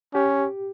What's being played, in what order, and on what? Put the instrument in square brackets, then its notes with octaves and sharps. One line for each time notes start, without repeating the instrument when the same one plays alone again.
[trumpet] C#4 [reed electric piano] G4